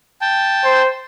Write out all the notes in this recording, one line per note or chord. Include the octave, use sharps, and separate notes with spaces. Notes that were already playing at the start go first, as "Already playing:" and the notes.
G5 A5
C5